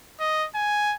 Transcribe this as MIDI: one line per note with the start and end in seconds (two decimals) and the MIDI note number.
0.20 0.46 75
0.55 0.96 80